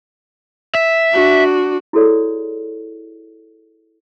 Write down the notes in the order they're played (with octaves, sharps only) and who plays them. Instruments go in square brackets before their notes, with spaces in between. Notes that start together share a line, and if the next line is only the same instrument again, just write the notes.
[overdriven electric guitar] E5
[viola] D4 F#4
[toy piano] E4 F#4 G#4 A4 C#5 D5